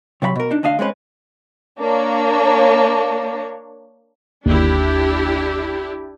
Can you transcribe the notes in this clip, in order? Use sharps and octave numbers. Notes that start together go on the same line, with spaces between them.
C3 F#3 F5 B5
B2 A#4
D4 D#4
D2 D4 D#5 F5
G#3 C4 C#4 B4
A#3 D4 C#5
G1 D#2 D4 E4 G4